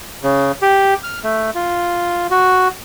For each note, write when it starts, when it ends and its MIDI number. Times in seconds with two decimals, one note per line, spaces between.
0.23 0.52 49
0.62 0.94 67
1.04 1.20 89
1.24 1.50 57
1.55 2.27 65
2.30 2.68 66